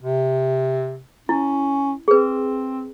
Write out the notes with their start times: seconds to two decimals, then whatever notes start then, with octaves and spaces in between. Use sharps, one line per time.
0.02 C3
1.29 C#4 E4
2.08 C4 G#4 B4